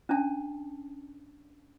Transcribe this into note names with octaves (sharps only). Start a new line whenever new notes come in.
C#4 D4 A5